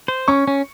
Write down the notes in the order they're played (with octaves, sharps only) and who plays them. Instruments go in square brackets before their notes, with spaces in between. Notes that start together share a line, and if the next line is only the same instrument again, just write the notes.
[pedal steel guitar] C5
[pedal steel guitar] C#4 [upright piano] C#6
[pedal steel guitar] C#4